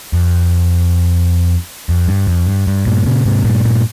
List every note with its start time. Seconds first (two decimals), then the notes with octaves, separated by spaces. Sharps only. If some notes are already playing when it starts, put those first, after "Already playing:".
0.13 F2
1.89 F2
2.08 G2
2.27 F2
2.47 G2
2.67 G2
2.86 G2 A#2
3.06 A#2 C#3
3.25 G#2 C3
3.45 G2 A#2
3.64 G2 A#2